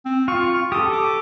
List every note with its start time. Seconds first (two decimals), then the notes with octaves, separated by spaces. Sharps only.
0.05 C4
0.28 F4 C#6
0.72 G4 A4 D#6
0.93 D6